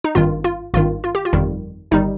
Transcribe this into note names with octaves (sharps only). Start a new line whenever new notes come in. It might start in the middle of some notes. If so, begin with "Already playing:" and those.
D#4
G#1 G2 D#3 F4
F4
G#1 G2 D#3 F4
F4
G4
F4
G1 F2 D#3 G3
G1 D#3 G3 D#4